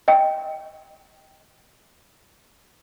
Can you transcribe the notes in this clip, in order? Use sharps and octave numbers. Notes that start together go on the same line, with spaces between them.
D#5 G5